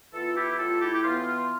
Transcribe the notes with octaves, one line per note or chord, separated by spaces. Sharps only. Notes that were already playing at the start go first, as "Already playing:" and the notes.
E3 B3 F4 A4
F4
E4 G4
A2 F4 A4
E4 G4
G4
E3 B3 F4
F4